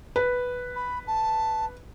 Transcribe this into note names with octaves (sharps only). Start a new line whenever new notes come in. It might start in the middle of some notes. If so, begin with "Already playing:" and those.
B4
B5
A5